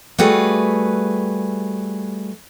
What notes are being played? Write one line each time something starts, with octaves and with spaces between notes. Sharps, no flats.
G3 A3 F#4 G#4 B4